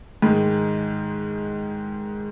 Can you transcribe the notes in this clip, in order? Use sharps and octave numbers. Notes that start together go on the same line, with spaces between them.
G#2 D#3 G#3